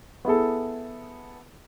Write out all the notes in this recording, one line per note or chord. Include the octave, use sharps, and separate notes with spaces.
B3 E4 G#4 A4